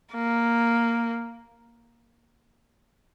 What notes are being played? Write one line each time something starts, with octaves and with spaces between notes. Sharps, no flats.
A#3